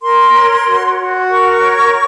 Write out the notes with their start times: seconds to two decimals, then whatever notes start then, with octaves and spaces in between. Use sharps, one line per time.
0.02 A#4 C6
0.34 C#5
0.66 F#4
0.98 F#4
1.29 A#4 C#6
1.61 C#5